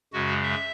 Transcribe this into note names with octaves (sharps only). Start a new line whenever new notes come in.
F#2 C#3 G#3 F#4
E5